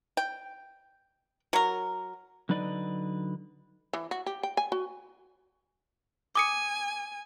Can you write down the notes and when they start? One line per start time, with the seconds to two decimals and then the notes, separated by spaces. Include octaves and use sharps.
0.17 G5
1.53 F#3 A#4
2.49 D3 F#3 D#4 B4 D5 D#5
3.93 E3
4.11 F#4
4.26 G4
4.43 G5
4.57 G#5
4.72 F#4
6.35 G#5 D6 D#6 C#7